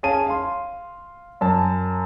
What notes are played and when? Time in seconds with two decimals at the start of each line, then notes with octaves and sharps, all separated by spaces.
0.03 C#4 G#4 F5 A5 D#7
0.27 F5 C6
1.41 F#2 A5